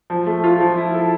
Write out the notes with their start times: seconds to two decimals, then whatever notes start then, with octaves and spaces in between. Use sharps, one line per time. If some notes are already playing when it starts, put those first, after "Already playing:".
0.10 F3
0.26 A3
0.44 F4
0.61 F3
0.77 E4
0.94 A4